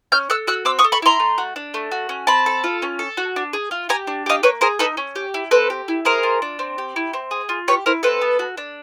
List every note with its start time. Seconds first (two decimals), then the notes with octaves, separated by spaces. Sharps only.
0.12 C#4 F6 G6
0.30 A4 E6 F#6
0.47 F#4 E6 F#6
0.65 C4 D6 E6
0.79 C#6 D#6
0.84 A4
0.92 B5 C#6
1.02 E4 A#5 C6
1.20 A3
1.38 F#4
1.56 D4
1.74 A3
1.91 F#4
2.09 C#4
2.27 C4 A5 B5
2.46 A4
2.64 F4
2.82 C#4
2.99 A4
3.17 F#4
3.36 D4
3.53 G#4
3.71 F4
3.89 G4 G#5 A#5
4.07 D4
4.26 G4 D#5 F5
4.43 A#3 B4 C#5
4.61 G#4 A#4 C5
4.79 D#4 A4 B4
4.97 C#4
5.15 G4
5.34 E4
5.51 C4 A4 B4
5.70 G4
5.88 E4
6.05 G#4 A#4 C5
6.23 F4
6.42 D4
6.59 C4
6.78 G4
6.96 E4
7.13 C4
7.31 G#4
7.49 F4
7.68 G4 B4 C#5
7.86 E4 A#4 C5
8.03 C4 A4 B4
8.21 B3
8.39 F#4
8.57 D4